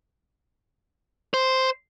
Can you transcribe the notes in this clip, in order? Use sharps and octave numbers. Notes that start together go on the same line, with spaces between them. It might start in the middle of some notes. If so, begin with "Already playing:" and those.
C5